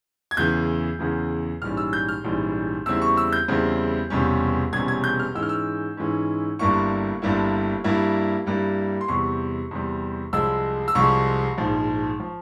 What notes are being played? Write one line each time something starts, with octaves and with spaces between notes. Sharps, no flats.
G#6
E2 C#3 E3 G6
E2 C#3 E3
A#1 G#2 E3 G3 C#4 F6
E6
G6
F6
A#1 G#2 E3 G3 C#4
E2 C#3 G3 C4 E4 E6
C#6
E6
G6
E2 C#3 G3 C4 E4
E1 E2 C3 G3 C#4
E1 E2 C3 G3 C#4 G#6
G#6
G6
F6
G#2 E3 G#3 C#4 E6
F6
E6
G#2 E3 G#3 C#4
G1 G2 G3 A#3 E4 C#6
G1 G2 G3 A#3 E4
G2 G3 A#3 E4
G2 G3 A#3 E4
C6
E2 C3 G3 C#6
E2 C3 G3
C2 C3 F3 G#3 E6
E6
C2 C3 F3 G#3 C#6
A#1 G#2 F3
F3